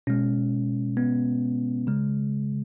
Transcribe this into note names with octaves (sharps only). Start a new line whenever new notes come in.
B2 G#3 C#4
B3
C#3 G#3